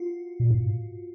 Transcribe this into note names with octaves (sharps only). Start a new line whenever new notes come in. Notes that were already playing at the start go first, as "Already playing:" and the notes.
Already playing: F4 F#4
A#2
G#2